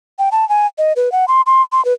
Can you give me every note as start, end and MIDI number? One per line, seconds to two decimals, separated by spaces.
0.19 0.29 79
0.32 0.47 81
0.49 0.66 80
0.78 0.93 75
0.96 1.12 71
1.12 1.25 78
1.28 1.41 84
1.46 1.62 84
1.72 1.83 84
1.85 1.93 71